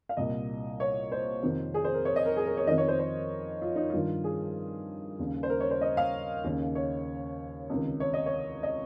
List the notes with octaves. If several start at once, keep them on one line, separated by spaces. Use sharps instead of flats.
F5
C2 A#2 D#5
C#5
C5
F2 C3 D#3
G#4
C5
A#4
C#5
D#5
A#4
G#4
A#4
C#5
F2 D#3 D#5
C#5
C5
C5
F4
D#4
G2 D#3 F4
G#4
D#2 C#3
C5
A#4
C#5
C5
D#5
F5
D#2 C#3
C#5
C#2 C3 D#3
C#5
D#5
C#5
D#5